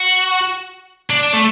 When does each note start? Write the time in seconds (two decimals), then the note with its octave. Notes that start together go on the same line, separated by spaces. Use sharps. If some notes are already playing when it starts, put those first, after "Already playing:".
Already playing: F#4
1.10 D4
1.34 A3